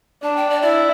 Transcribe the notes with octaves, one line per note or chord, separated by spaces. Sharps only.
D4 A5
G5
D5
E4 D5